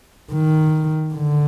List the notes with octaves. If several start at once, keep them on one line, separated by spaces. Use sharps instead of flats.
D#3
D3